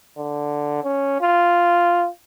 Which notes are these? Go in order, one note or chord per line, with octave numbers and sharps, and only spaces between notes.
D3
C#4
F4